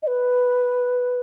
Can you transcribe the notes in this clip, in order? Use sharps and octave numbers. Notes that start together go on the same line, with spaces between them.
D#5
B4